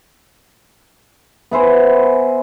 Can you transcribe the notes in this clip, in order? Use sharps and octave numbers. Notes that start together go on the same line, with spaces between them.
B3 E4 C5 G#5